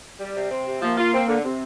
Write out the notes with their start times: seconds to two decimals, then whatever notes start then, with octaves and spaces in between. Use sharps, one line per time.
0.20 G3
0.36 C3
0.51 C4
0.66 C3
0.82 F3 A#3
0.98 F4
1.13 C4
1.28 D3
1.43 C3 C4